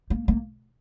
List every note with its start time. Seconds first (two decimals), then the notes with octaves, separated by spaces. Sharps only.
0.10 A#3
0.28 A#3